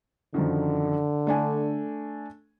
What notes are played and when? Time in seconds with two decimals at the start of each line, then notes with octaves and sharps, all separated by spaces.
0.34 F#2 D3 D#3 F3
1.27 A3 D4 G#5